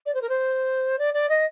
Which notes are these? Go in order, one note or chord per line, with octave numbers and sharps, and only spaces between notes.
D5
C5
A#4
C5
D5
D5
D#5